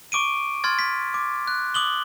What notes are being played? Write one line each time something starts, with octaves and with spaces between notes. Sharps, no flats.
C#6 D6 D7 D#7
C6 F6 G#6 A6
B6
D6
F#6
D6 D#6 F#7 G7